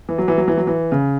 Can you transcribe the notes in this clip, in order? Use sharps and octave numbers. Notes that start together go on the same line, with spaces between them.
E3
F#3
E3
F#3
E3
F#3
E3
C#3